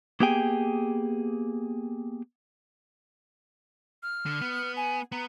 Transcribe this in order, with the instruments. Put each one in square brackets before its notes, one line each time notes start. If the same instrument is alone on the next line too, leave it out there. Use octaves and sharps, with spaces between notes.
[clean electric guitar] A#3 B3 G4 G#4 G5 G#5
[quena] F6
[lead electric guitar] D3
B3
[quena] G#5
[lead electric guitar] B3 [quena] A#5